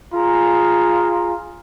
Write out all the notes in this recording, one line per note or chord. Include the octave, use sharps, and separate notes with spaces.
F4 G#4 A#5